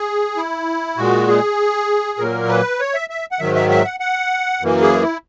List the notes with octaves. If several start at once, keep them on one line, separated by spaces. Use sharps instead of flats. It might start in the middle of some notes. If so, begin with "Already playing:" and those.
Already playing: G#4
E4
A#2 G#3 F#4
G#4
A#2 F#3 A#3 A#4
B4
C#5
E5
E5
F#5
G#2 D#3 F#3 E5
E5
E5
F#5
F#5
F#2 E3 A#3
G#4
E4